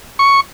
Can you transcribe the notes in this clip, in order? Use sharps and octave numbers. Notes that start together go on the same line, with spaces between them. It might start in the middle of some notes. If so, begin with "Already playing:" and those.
C#6